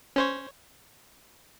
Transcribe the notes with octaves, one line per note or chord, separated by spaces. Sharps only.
C#4 C5 C#5